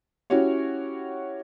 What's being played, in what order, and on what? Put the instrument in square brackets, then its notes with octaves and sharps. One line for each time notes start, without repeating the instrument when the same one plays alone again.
[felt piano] C#4 E4 F#4 G4 C#5